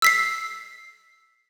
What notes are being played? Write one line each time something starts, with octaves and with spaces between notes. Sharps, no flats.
E6 B6 C7